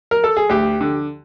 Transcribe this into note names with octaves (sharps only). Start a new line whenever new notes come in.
A#4
A4
G#4
D2 G4
D3